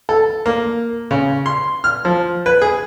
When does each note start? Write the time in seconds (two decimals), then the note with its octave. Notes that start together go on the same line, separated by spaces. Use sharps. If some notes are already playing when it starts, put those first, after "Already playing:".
0.09 A4
0.46 A#3
1.11 C#3
1.46 C6
1.84 F6
2.05 F3
2.46 B4
2.62 G#4